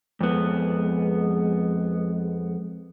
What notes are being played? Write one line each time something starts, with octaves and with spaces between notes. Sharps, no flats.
F2 G#3 B3